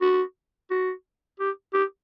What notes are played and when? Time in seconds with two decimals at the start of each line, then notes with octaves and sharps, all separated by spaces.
0.01 F#4
0.71 F#4
1.39 G4
1.73 G4